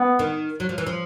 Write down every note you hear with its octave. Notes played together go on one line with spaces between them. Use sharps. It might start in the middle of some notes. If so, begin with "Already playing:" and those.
Already playing: B3
D#3
F#3
F3
E3
F3